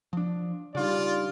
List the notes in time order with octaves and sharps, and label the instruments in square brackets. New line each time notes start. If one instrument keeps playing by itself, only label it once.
[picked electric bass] F3 D4
[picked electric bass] C#3 G3 [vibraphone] D4 D#4 G4 [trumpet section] F4 D5